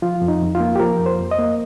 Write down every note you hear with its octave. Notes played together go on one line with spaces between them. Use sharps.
F3 F4
F2
D#4
F2
F4
A#3
G4
F3 A#4
F2
C5
F2
D#5
A#3